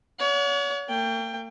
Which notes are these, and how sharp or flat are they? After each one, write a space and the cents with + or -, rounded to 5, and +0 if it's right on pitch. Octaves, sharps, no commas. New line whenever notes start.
C#5 +40 F#5 -30
A#3 -45 G5 +15